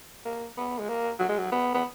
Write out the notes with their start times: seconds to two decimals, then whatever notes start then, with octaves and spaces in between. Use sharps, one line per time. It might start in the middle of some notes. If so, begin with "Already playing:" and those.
0.25 A#3
0.57 B3
0.79 G#3
0.89 A#3
1.20 F#3
1.29 G#3
1.38 F#3
1.52 B3
1.75 B3